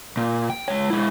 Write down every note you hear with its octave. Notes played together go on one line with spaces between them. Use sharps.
A#2
G5
G#3 C#5
G#3 E4